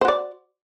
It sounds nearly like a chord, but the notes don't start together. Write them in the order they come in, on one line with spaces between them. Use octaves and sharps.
C5 F#4 D5